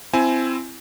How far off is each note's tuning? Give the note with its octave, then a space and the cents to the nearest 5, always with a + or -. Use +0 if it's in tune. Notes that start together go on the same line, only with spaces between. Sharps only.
C4 +0 E4 +20 G#5 +15